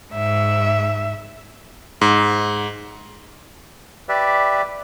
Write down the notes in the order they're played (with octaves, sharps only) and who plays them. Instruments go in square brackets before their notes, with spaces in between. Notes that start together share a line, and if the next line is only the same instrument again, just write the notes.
[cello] G#2 [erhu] E5
[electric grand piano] G#2
[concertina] G4 B4 D5 E5